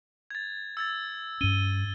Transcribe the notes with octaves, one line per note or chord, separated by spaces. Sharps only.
G#6 A6
E6 G#6 A6
G2 C#4 D#7 G7